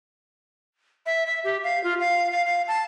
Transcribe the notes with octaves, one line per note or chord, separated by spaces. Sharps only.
E5
E5
G4
F5
F4
F5
F5
F5
A5